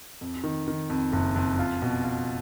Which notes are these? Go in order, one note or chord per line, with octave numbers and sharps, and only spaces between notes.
F2
D#3
D#3
F2
F#1
F2
F4
B2
F4